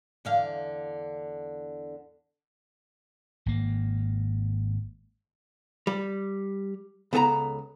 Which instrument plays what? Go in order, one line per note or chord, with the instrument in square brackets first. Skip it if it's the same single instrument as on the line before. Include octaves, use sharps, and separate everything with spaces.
[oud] E2 D3 F5
[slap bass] G#1 A#3
[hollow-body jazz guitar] G3
C#2 B3 A4 G#5 A#5